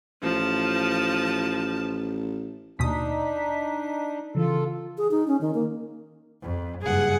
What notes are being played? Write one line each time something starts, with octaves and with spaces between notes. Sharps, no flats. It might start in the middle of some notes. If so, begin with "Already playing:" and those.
A1 F3 A5
D#2 B2 D4 D#4 D#6 B6
C#3 E3 F4 A4
G#4
D#4
C#4
D#3
A#3
F2
F#1 G2 G#4 F#5